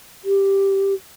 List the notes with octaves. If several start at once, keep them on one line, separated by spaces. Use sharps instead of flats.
G4